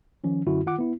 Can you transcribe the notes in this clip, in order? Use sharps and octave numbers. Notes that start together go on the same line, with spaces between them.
D#3 F3 C#4
F#2 D3 E4 F#4
D#3 F4 F#5 D6
B3 E4